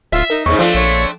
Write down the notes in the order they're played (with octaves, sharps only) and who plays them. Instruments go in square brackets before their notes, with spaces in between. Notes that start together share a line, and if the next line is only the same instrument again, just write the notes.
[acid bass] D1 [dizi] F4 [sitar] E5
[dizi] D#4 [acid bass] A#4
[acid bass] E2 [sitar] G#2 C#3 [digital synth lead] C#6
[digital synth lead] F3 [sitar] A3 C4 D4 [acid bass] F4
[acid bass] A#1 [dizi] C#5